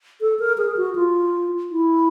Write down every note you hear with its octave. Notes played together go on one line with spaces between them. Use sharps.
A4
A#4
G#4
F#4
F4
E4